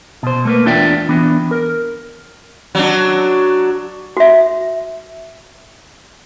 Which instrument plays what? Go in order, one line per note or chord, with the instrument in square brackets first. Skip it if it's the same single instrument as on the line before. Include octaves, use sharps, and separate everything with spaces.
[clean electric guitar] B2 C5
A3 A#3 B4
E2 D4 F4 D5 E5 G5
E3 B3 D4
A#4
[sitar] F#3 D4
[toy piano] F#4 E5